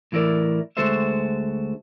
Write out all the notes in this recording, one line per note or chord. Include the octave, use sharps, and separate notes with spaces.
A2 E3 E4 A#4 D5
D2 G#3 F#4 A4 C5 E5